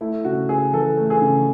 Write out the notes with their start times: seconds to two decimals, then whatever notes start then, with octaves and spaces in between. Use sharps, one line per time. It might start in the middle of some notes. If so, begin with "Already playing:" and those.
0.01 A3 E4
0.25 C#3 F#4
0.49 C#3 G#4
0.73 E3 A4
0.97 A3
1.10 G#4
1.22 C#3